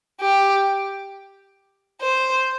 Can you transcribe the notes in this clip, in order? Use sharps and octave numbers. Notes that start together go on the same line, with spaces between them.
G4
C5